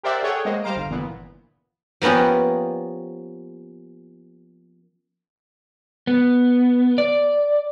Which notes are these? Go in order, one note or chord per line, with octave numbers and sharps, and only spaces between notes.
G4 A#4 C5 D5 E5 F#5
G#4 A4 C#5 F#5 G5
G#3 A#3 C5 D#5
G3 C5 F5 A#5 D7
G1
G1 A#2 E3 B3
F3 A#3 B3 C#4 G4
B3
D5